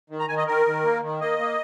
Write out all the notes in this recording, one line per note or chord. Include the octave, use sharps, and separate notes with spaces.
D#3
A#5
D#3 G#5
D#5
D#3 A#4
D#3
A#3
D#3
A#3 D#5
A#3